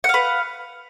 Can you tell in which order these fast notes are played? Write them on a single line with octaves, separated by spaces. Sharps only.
F#5 F5 B4